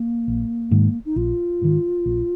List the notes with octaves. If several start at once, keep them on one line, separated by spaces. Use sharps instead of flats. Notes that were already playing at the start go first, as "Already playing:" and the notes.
Already playing: A#3
A#1
G#2 D#3
D#4
A#1 F4
G#2 D#3
A#1